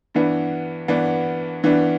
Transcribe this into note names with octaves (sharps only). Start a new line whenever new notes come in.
G2 E3 B3 D4
G2 E3 B3 D4
G2 E3 B3 D4